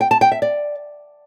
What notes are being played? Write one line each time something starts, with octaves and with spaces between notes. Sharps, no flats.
G5
A5
G5
E5
D5